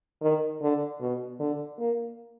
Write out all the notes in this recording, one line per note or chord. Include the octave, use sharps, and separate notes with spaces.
D#3
D3
B2
D3
A#3